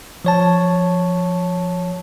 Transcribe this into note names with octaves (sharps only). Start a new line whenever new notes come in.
F3 C#5 A5